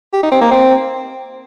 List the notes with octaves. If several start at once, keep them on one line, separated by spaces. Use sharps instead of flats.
G4
D#4
C4
A#3
C4